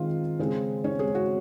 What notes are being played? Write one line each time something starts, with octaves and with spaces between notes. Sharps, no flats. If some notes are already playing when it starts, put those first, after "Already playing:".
Already playing: D#3 G#3 C4 F4 F5
C#3 G#3 C4
C#4 C#5
G#3 G#4
F#4